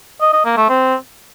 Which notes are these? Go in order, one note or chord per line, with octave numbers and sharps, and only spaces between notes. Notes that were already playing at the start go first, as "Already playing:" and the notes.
D#5
D#5
A#3
A3
C4